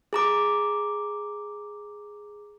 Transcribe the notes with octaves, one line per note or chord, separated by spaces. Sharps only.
G#4 A#5 D6